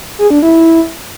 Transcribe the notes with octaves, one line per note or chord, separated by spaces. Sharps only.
G#4
D4
E4